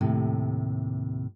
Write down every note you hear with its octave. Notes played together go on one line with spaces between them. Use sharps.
D#2 A2 C3